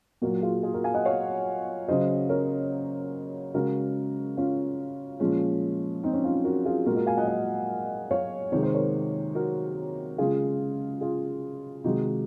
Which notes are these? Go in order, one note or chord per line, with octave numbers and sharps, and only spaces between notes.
A#2 F#3 F#4 A#4
F4 G#4
F4 G#4
F#4 A#4
F5 G#5
D#5 F#5
C#5 F5
C#3 F#3 C5 D#5
A#4 C#5
C#3 G#3 F#4 A#4
C#4 F4
A#2 F3 G#3 C#4
C4 D#4
C#4
C#4 F4
F#4 A#4
F4 G#4
A#2 G#3 F#4 A#4
F#4 A#4
F5 G#5
D#5 F#5
D#5 F#5
C#5 F5
C3 D#3 G#3 C#5
C5
A#4 C#5
F#4 A#4
C#3 G#3 F4 G#4
F4 G#4
C3 D#3 G#3 D#4 F#4